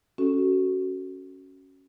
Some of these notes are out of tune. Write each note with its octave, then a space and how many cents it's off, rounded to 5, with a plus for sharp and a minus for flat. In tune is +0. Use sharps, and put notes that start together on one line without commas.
C#4 +0 F#4 +15 A4 +0